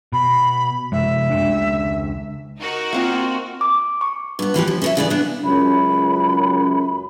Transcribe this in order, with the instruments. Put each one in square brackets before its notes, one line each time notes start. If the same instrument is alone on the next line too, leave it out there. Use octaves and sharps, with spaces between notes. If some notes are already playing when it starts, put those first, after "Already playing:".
[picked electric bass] B2 [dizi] B5
[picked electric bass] F#2 C3 G#3 [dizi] E5
[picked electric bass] C#2 G#3 D4
[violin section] D#4 F#4 A#4
[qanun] A#3 C4 F4
[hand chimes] D6
C#6
[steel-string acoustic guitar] G2 B3
D#2 E3 F3 G4
F3
C#4 A#4 E5
D2 C#3 E3 D5
B3 D4
[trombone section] C#2 F#2 [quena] B5